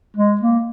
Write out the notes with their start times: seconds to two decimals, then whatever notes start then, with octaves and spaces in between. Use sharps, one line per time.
0.16 G#3
0.41 A#3